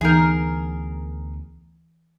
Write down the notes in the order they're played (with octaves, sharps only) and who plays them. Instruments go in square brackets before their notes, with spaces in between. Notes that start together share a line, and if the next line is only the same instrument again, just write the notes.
[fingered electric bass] D2 B3 [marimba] E3 D#4 G6 [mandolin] G#4 A#4